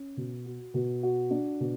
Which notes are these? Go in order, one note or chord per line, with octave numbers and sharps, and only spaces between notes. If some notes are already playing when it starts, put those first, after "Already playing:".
Already playing: C#4
B2
F#4
B2
F#4
D4
B2